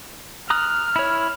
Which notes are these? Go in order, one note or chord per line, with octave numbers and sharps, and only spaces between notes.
A#5 D#6 F6 F#6
E4 C#5